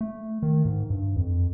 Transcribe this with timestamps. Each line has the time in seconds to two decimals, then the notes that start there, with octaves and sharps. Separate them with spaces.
0.01 A3
0.43 D#3
0.65 G#2
0.90 G2
1.17 F2